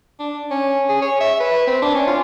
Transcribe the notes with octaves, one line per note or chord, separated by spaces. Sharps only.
D4
C#4
G#4
C#5
E5
B4
C4
D4
C#4
F4